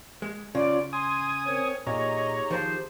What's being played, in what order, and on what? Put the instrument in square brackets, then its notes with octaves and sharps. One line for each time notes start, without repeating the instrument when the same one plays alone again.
[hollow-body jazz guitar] G#3
[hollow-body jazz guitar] C#3 [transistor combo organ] C#4 F4 [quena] D5
[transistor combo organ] G#5 D#6 [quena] C6
[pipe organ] C4 A#4 C5 [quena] C#5
[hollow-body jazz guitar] A#2 [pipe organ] D#4 G4 G#4 [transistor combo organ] C#5 A#5 [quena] D#5
[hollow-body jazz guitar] D#3 F3 F4 [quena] C5